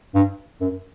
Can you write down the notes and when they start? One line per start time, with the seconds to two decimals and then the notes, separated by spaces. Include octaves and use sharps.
0.15 G2
0.61 F#2